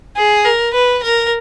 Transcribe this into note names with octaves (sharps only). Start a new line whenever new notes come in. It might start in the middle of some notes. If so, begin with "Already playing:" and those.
G#4
A#4
B4
A#4